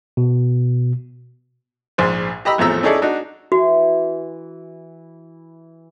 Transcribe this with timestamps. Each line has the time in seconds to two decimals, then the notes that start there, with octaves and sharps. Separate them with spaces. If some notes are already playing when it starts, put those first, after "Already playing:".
0.17 B2
1.98 A#1 G#2 C5
2.45 G4 D#5 A#5 B5 E6
2.58 G#1 E2 A2 F3 A#5 E6
2.83 C#4 D#4 E4 G#4 A4 D5
3.02 D4 D#4 F#4
3.52 E3 F#4